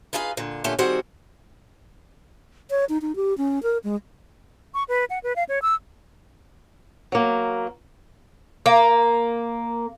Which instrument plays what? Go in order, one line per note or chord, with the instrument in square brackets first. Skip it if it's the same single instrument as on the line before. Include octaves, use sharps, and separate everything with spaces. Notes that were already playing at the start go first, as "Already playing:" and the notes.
[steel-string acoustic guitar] D#4 F4 G#4 B4 F5
A#2 D3
A#2 D3 A3 C#4 G4
D#3 G3 C4 F#4 G#4 F#5
[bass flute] C#5
D#4
D#4
G4
C#4
A#4
G#3
[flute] C#6
B4
F#5
B4
F5
C#5
E6
[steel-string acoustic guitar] F#3 A#3
[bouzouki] A#3